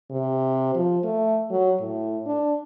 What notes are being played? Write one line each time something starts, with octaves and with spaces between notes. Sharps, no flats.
C3
F3
A3
F#3
A2
D4